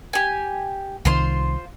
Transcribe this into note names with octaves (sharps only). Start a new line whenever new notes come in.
G4 G#5
C2 D#3 F4 C5 C6